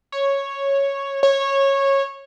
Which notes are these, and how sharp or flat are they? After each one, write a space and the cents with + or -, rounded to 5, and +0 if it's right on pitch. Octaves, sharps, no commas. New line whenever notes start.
C#5 -5
C#5 -15